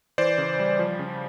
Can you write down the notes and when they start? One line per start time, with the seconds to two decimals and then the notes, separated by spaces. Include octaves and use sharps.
0.18 E3 C5 D5
0.38 C#3
0.59 G3
0.79 F3
0.99 C#3